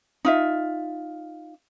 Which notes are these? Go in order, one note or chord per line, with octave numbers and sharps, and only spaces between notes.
D#4 F4 E5